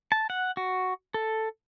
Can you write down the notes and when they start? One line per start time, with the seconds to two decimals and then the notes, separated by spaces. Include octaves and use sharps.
0.12 A5
0.30 F#5
0.57 F#4
1.14 A4